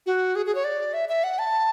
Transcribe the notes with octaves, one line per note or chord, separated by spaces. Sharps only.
F#4
G#4
G#4
C#5
D5
E5
E5
F#5
A5